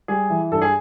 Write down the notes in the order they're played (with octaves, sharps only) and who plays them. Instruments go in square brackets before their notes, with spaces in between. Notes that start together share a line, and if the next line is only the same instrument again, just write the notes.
[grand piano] G3 G#4
E3
G2 A4
G#4